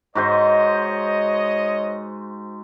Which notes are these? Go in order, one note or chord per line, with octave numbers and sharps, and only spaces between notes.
G#2 F#4 C5 C#5 D#5